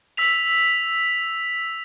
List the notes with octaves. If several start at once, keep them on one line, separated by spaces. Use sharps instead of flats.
E6 B6 F7